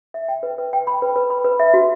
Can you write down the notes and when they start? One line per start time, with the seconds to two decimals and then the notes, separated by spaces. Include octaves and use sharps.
0.14 E5
0.28 G5
0.43 B4
0.58 B4
0.73 G5
0.87 B5
1.02 B4
1.16 B4
1.30 B5
1.44 B4
1.60 E5
1.74 F#4